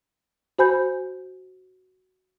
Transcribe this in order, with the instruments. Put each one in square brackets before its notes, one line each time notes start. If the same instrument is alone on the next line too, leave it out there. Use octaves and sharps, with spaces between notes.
[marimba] F#4 C5 G#5 B5 G6